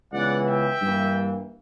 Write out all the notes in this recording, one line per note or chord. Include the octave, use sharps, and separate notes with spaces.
C#2 C#3 E3 B3 D5 F#5
E5 G5
G2 E3 A#3